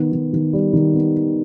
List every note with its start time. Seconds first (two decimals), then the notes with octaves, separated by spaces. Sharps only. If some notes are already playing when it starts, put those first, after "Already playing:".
Already playing: D#3 B3
0.12 D#3
0.33 D#3
0.53 G3
0.73 D#3
0.94 B3